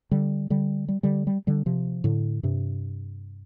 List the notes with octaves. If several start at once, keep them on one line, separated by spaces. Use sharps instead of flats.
D3 G3
D3 G3
G3
D3 G3
G3
D3 G3
C3 F3
A2 D3
G2 C3